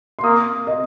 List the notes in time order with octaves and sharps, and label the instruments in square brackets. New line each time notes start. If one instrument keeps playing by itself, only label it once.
[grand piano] C6
[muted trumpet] A#3 [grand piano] D#6
[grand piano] D#5